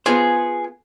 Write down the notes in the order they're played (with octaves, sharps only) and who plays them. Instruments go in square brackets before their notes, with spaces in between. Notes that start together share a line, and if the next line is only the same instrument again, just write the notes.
[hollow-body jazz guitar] B3 F4 C5 [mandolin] G#4